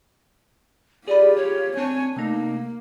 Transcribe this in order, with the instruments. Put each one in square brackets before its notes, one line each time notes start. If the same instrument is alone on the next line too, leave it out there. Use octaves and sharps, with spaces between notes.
[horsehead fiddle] F4 G4 [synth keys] G#4 B5 [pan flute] D5
[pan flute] C#5
[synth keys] C4 A5 [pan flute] D4 [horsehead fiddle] C#5 G#5
[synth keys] C3 A3 D#4 [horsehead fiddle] A#3